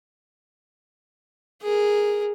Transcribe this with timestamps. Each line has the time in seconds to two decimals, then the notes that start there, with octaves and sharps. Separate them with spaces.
1.62 G#4 A#4